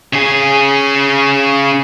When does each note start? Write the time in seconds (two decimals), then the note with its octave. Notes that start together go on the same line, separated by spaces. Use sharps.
0.13 C#3 G#4